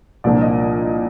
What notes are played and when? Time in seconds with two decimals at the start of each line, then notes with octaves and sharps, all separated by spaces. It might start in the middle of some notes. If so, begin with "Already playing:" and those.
0.24 C2 A#2 F3 A#3 D4 D5
0.41 D#5